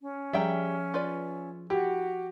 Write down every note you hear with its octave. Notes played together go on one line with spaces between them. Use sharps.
C#4
F3 G3 G#4 E5 G5 A#5
F4 B4 D5
E4 F#4 G4